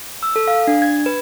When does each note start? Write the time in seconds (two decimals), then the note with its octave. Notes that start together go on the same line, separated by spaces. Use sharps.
0.23 E6
0.36 A4
0.48 F5
0.67 D4
0.82 G#6
1.06 B4